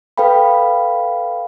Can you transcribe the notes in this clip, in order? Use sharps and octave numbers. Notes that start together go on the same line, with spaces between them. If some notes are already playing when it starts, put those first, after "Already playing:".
A4 B4 F5 G5 B5